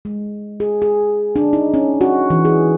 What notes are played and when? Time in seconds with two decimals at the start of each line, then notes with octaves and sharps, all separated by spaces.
0.05 G#3
0.60 G#4
0.82 G#4
1.36 D4
1.53 D#4
1.74 C#4
2.01 F#4
2.30 E3
2.45 G#4